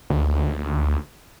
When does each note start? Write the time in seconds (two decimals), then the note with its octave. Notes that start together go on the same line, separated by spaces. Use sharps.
0.10 D2